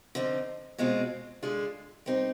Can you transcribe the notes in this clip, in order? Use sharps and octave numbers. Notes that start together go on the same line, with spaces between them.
D3 F3 C4 D#4
B2 G#3 C4 F4
D3 G#3 D4 F4
G3 C4 D#4